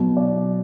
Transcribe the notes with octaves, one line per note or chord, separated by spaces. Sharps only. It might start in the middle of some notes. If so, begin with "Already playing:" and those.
Already playing: B2 F#3
D5